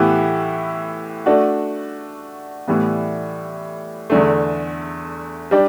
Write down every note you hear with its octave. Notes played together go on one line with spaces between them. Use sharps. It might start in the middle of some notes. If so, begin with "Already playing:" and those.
Already playing: A2 E3 B3 E4 G4
A3 D4 F#4
A2 E3 G3 B3
E2 D3 A3
G3 D4 G4